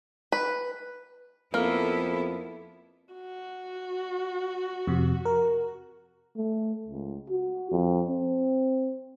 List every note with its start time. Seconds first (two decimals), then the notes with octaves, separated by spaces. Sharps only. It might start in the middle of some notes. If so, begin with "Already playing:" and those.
0.32 B4
1.54 F2 A#3 B3 E4 A4
3.13 F#4
4.87 F2 C3
5.25 A#4
6.36 A3
6.87 C#2
7.30 F#4
7.71 F2
8.08 C4